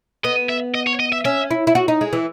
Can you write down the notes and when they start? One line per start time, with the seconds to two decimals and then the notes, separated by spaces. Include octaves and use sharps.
0.24 B3 D#5
0.49 E5
0.74 D#5
0.87 C#5
1.00 D#5
1.12 E5
1.25 C#4 E5
1.51 E4
1.67 E4
1.75 F#4
1.88 D#4
2.01 G#3
2.13 E3